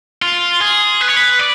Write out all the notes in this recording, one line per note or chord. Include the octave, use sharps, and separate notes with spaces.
F4
G#4
B4
C#5
B4
D5